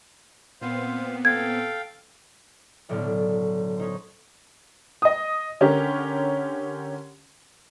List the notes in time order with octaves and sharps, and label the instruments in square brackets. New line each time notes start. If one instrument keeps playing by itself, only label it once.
[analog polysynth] A#2 B3 C4 [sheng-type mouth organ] C5 F5
[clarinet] A4 [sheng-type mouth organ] F5 G5 [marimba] G#6
[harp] F#1 B1 A2 D3 D5 F6
C#4 D#4 C5
[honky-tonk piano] D#5 D#6
D3 C#4 G4 A#4